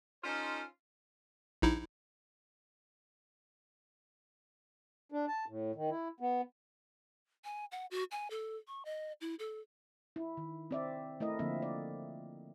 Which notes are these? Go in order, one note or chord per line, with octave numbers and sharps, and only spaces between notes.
C#4 D#4 F4 A4 C5
A#1 D#4 E4
D4
A5
A2
D#3
E4
B3
G#5
F#5
F#4
G#5
A4
C#6
D#5
E4
A4
E4
D#3
C4 D5 E5
A3 E4 A#4 D#5
D3 F3 A#3 C4 E5
D5